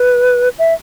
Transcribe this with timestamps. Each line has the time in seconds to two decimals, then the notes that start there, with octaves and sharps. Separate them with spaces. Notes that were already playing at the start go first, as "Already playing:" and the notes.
Already playing: B4
0.59 E5